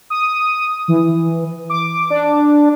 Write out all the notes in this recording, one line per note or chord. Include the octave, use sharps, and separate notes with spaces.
D#6
E3
D6
D4